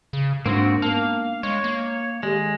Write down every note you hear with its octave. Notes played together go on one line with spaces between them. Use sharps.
C#3
G#2 G#3 A#3 C4 D4 D#4 F#4
A#3 B3 A#4 F5 A5
G#3 C#5
A#3
D#3 G#3 G4 A4